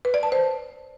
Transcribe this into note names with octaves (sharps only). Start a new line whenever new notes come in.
B4
D5
A5
C5